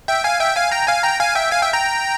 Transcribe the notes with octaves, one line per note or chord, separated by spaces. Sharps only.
E5 G5
F5 G#5
E5 G5
F5 G#5
G5 A#5
F5 G#5
G5 A#5
F5 G#5
E5 G5
F5 G#5
E5 G5
G5 A#5